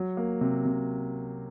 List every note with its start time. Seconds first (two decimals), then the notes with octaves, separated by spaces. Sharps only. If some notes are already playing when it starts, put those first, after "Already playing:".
Already playing: F#3
0.17 A#3
0.41 C3
0.65 C3